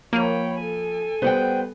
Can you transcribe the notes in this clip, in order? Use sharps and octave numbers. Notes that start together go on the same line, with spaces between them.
F3 A#3 C#5 G5 B5 D#7 F7
A4 G#5
G3 B3 C5 F#5 G5